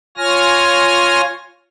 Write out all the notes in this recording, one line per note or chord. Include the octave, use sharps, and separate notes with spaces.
F4 C#5 G#5 F6 A#6